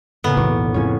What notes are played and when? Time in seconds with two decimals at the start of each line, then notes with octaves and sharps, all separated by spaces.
0.24 A2 C#3 A#3 B3
0.37 B1 E2 C#6 D6
0.74 F2 A2 C#3 C#4 C#5